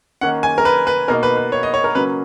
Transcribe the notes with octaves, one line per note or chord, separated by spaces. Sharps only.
D#3 A#3 C#4 F#5
G#5
A#4
B4
B4
B2 A#3 D#4 A#4
B4
B4
C#5
D#5
C#5
A#4
C#3 F#3 A#3 C#4 B4